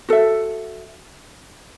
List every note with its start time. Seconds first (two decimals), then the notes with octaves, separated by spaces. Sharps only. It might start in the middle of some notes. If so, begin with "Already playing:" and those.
0.09 F#4 A4 E5